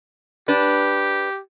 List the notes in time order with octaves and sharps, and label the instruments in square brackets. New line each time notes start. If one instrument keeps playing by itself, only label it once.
[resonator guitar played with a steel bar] D4 B4 [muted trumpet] G4